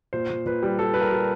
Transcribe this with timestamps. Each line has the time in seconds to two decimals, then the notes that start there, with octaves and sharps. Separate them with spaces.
0.13 A#2 C5
0.30 A#2
0.46 A#2 B4
0.63 G3
0.79 G3 A4
0.94 G3 B4
1.01 A#4
1.12 G3